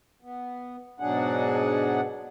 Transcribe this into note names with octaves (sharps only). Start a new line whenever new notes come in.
B3
G#2 B2 F#3 D4 G#4 F#5